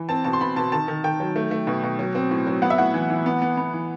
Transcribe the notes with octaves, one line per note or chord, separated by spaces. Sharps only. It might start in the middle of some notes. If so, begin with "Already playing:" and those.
Already playing: E3
C4 A5
B2 A5
C6
B2 B5
B2 A5
D#3 A5
D#3
D#3 G5
F#3
A3
A3
B2
B2
F#3
C4
A2
F#3
B3 F#5
E5
A2 F#5
E3
E3
B3
B3
B3
E3